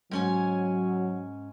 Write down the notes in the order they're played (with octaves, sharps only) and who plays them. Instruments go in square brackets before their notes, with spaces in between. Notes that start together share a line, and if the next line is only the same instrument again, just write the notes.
[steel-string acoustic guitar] G#2 C#4 G#5 [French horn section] F#3